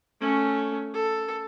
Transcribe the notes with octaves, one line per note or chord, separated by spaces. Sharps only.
A3 C#4
A4